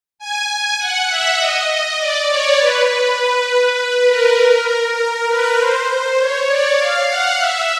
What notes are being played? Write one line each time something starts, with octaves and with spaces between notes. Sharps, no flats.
G#5
G#5
F#5
E5
D#5
D#5
D5
C#5
B4
B4
A#4
B4
C5
C#5
D5
F5
F#5
E5